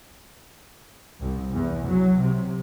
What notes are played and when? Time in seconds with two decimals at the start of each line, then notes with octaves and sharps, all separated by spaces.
1.20 C2
1.54 E2
1.88 F#3
2.22 C3